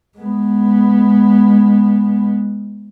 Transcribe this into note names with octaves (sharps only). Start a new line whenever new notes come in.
G#3 B3